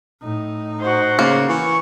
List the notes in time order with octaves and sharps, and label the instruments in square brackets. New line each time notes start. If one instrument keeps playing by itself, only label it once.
[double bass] A2 D#4
[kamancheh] F#4 C5
[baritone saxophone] C#3 [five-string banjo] A#3
[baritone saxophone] E3 [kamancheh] C#6